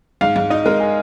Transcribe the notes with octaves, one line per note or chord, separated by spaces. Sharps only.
G#2 F5
G#2 F5
D#4 D#5
G#3 A#4
G#4